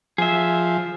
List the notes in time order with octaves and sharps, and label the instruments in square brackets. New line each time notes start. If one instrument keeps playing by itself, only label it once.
[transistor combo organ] F3 [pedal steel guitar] G#4 E5